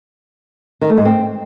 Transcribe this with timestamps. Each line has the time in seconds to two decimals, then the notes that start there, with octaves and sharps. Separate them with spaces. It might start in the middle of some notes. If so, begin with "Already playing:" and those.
0.81 D#3
0.89 A3
0.97 G#2
1.05 C4